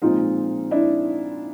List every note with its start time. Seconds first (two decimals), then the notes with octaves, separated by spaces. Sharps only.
0.02 A#2 F3 G#3 C4 D#4 F4
0.71 D4 E4